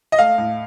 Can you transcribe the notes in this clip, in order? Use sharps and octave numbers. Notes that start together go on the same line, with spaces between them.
D#5
A3 F5
A2